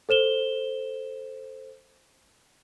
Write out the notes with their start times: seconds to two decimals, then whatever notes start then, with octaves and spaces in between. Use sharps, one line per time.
0.09 A4 C5 E7 G7